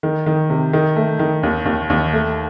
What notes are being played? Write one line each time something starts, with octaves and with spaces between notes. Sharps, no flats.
D#3
D#3
C3
D#3
A3
D#3
D#2
D#2
D#2
A3